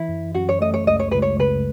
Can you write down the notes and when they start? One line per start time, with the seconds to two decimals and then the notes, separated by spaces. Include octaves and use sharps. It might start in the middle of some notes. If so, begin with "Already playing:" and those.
Already playing: E3 E4
0.09 F#2
0.34 F#2 F#4
0.49 C#5
0.61 A3 D#5
0.74 C#5
0.87 C#2 D#5
1.00 C#5
1.11 C#2 B4
1.22 C#5
1.39 C#3 B4